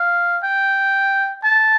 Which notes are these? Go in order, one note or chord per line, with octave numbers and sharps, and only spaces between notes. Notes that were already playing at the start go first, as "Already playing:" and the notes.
Already playing: F5
G5
A5